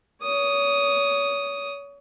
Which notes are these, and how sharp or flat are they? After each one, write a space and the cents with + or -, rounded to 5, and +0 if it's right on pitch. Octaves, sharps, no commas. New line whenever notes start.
C#5 +30 D#6 +0